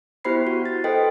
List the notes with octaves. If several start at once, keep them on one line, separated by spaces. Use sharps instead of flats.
B3 E4 G4 C5 B5 C7
F#4
A6
A4 B4 C5 D#5 G5